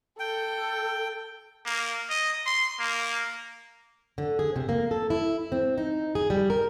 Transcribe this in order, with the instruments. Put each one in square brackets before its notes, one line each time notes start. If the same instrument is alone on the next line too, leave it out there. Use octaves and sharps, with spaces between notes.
[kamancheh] A4 [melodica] G5
[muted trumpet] A#3
D#5
C6
A#3
[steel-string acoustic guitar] D3
G#4
C3
A#3
A4
E4
C4
D#4
G#4
G3
A#4